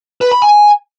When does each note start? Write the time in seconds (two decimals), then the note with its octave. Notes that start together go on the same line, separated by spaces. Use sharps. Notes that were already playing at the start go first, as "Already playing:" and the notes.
0.21 B4
0.32 B5
0.42 G#5